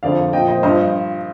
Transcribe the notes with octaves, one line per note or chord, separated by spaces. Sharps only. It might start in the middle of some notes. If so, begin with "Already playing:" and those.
F2 D3 F3 D5 F5
A#2 F3 D#5 G5
C5 D#5
G2 F3 C5 D#5